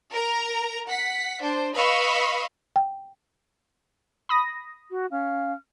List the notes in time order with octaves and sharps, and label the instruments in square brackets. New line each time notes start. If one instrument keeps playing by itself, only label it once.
[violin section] A#4 A#5
F#5 B6
D4 C5
B4 D#5 F5 B5 C#6 E6
[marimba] G5
[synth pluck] B5 D#6 A#6
[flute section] F#4
C#4 F5 F6